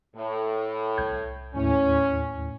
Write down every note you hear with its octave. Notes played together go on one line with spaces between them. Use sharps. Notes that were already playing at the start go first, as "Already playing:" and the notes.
A2
C2 G6 G#6
D#2 A2 C#4